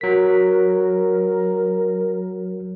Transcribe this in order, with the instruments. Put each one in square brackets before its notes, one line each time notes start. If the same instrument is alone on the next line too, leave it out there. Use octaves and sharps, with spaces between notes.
[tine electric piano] F#3 B6 [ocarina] A#4